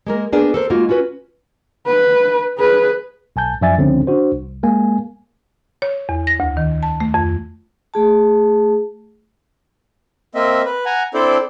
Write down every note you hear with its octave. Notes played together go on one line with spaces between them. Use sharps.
G#3 A#3 A#4
A#3 B3 D4 G#4 A#4 D5
A4 A#4 C5
G#3 A#3 D#4 F4 F#4
C#4 F4 F#4 B4
B4
G#4 B4
B1 G#5 A5 G6
F#2 F3 D5 E5 G#5 A6
C#2 D3 F3 C4 C#4
D4 F#4 C5
C2
G#3 A#3 G#5
C#5
E2
A#6
D2
D#3
A5
A3
F2
A3 G#4 A5
A#3 C4 D#5 E5
B4
F#5 G#5 A#5
C4 D4 E4 A4 C5 D5